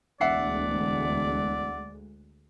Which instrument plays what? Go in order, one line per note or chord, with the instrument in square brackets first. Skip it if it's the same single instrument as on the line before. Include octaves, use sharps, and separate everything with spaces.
[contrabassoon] E1 [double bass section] D2 G#3 [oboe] D5 [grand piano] E5 F#5 C7